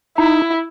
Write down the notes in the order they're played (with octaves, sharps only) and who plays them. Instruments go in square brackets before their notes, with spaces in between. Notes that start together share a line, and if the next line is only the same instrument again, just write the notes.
[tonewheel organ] D#4 [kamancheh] E4